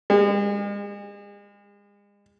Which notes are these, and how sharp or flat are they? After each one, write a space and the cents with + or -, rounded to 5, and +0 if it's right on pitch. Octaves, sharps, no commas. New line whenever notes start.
G#3 -40